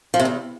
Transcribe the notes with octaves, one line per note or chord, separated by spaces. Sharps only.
F3
C3
E2